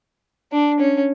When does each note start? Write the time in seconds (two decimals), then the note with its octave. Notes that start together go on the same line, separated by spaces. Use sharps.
0.52 D4
0.79 C#4